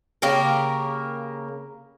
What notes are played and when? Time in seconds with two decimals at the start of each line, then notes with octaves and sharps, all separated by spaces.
0.22 C#3 A#3 G4 A#4